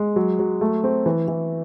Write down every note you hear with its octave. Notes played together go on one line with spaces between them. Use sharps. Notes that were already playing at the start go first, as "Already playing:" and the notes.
Already playing: G#3
F#3
F#3
A3
C4
E3
E3